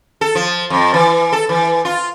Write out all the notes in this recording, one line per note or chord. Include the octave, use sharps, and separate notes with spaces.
A4
F3
F2
E3
A4
E3
F4